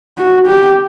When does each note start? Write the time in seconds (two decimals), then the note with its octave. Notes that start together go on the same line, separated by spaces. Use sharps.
0.18 F#4
0.47 G4